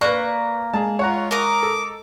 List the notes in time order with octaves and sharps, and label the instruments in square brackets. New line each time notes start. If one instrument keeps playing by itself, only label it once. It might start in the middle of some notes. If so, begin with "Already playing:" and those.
[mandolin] A#3 A#5 F#6 [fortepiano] B4 C#6 [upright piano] D5
[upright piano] G#3 [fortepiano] G#4 A5
[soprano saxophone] F4 [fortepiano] C#5 F#5 A#5
[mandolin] A#4 D#6 [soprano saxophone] D6
[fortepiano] A4